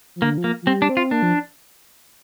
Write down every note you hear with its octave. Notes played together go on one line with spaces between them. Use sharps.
F3
D3 A#3
F3
A#3
F3
G3 C4
D4
C4
F4
A#3 D4
F3